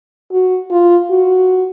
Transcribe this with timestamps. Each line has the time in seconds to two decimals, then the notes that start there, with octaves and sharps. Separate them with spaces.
0.32 F#4
0.71 F4
1.11 F#4